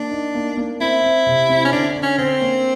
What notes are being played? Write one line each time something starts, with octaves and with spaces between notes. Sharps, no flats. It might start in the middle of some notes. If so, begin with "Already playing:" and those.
Already playing: A#3 D4
D#4
A#3
A#3
C4 E4
C4
C3
C4
C#4
D3 D4
D3
C#4
D3 C4
A#3